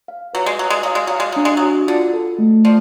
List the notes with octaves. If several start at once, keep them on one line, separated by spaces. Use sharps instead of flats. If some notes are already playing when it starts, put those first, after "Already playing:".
F5
F#3 B4
G#3
F#3 F5
G#3
F#3 F5
G#3
F#3 F5
G#3
F#3 D4
G#3
F#3
F#4
D3 F4
A4
A3
F3 D5